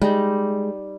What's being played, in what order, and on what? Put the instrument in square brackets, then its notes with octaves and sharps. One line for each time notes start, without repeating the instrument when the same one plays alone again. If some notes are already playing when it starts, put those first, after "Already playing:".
[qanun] G3 D#4 [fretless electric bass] G#3